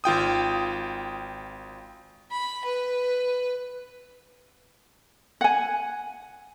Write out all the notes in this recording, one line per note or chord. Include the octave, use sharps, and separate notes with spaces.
G#1 F4 G5 D#6
B5
B4
F#5 G#5